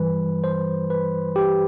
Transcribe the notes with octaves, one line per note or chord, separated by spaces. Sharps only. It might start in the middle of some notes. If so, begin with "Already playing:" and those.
Already playing: G2 E3 G3 B4
C5
B4
G4